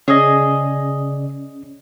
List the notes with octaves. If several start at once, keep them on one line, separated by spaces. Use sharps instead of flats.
C#3 C#4 G#4 D5 D#5